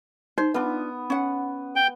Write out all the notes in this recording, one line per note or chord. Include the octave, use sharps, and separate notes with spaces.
D#4 C5
B3 D4 F4
C#4 F#5
G5